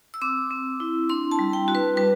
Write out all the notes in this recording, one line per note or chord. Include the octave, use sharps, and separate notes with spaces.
E6
C4 D6
C4
E4
D4 C6
A5
G3
G5
F#4
B4
G3 B4